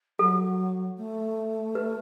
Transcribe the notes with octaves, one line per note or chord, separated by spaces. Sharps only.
F#3 A4
A3
B4